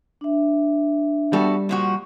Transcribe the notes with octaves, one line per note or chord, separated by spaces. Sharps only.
D4 E5
G3 B3 F#4 A4
A#2 F3 F#4